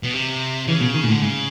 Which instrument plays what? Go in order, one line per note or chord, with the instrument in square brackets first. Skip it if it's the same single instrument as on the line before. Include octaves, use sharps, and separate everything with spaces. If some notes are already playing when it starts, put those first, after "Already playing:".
[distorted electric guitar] B2
C3
[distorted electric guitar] C#3 [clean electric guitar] E3
[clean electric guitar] B2
D#3
A#2
[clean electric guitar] A2 [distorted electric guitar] D3
[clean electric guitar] G#2 [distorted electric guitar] C#3